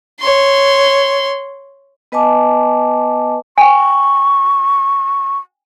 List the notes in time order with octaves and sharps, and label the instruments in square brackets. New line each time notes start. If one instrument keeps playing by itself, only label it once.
[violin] C#5 C6
[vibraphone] B3 B4 D#5 G#5 A5 D6
[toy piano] G5 G#5 [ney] C#6